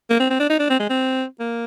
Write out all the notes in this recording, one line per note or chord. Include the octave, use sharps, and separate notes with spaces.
A#3
C4
C4
D4
D#4
D4
C4
G#3
C4
A#3